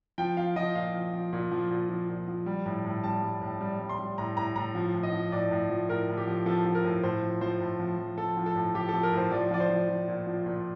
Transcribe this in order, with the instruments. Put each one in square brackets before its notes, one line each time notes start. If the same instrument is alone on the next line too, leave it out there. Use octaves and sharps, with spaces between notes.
[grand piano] F3 G5
F3 F5
F3 D#5
A#2 F5
F3
F3
A#2
F3
A#2
F3
A#2
F3
G3
A2
A2
G3 A5
G3
A2
G3
G3
C6
G3
A2 A#5
A2 A#5
A2 A#5
F3
A2
D#5
F3
A2 D5
A2
F3
A2 A#4
A2
G4
F3
F3 A4
F3
A#4
A2
A2 C5
F3
F3 C5
A2
F3
F3
F3 A4
F3
A4
A2
F3 G4
F3 A4
A#4
A2 C5
F3 D5
F3 D5
C5
F3
F3
A#2
F3
A#2